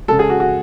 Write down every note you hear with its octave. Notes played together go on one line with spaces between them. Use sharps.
C#3 G#3 A4
G#4
F#4
F#4